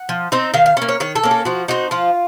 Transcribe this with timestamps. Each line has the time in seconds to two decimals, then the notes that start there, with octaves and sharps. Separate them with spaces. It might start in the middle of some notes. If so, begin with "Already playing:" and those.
Already playing: F#5
0.09 F3
0.32 C4 D#4
0.54 D#3 F5
0.66 F5
0.77 A#3 C#4
0.89 C#5
1.00 D#3 C#5
1.15 A4
1.23 A#3 C#4
1.31 A4
1.45 F3 F#4
1.68 C4 D#4 F#4
1.91 F3 F4